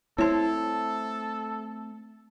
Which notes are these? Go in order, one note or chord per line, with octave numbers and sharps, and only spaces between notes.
A3 C4 E4 A4 C5 C#5 A5